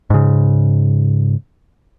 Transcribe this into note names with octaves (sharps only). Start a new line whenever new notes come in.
G#2 C#3